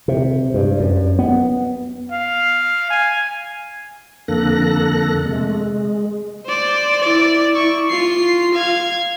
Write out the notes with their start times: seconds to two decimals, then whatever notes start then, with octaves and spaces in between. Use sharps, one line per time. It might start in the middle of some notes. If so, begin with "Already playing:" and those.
0.08 C3
0.54 G2
0.80 F#2
1.19 B3
2.12 F5
2.90 G#5
4.28 F2 D3 A#3 A4 F#6 A#6
5.26 C3 G#3 A3
5.48 G#3
6.46 C5 D5
7.01 E4 D5
7.54 E4 C#6
7.90 F4 C7
8.54 F5 G#6